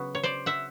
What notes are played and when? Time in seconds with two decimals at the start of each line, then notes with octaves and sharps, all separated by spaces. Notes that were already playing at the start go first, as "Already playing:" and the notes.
Already playing: C#3 F#3 B3 F#4
0.15 C#5
0.23 C5 D5
0.46 E5 F#5